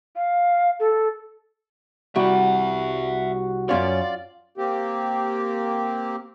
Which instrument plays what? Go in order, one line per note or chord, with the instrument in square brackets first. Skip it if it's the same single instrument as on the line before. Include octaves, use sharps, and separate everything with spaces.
[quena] F5
A4
[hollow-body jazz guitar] C2 G3 [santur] F#4 [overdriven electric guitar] E5 F#5
[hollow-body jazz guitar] F#2 C#4 C#5 [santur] F4 [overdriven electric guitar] D5
[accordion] A#3 C4 G4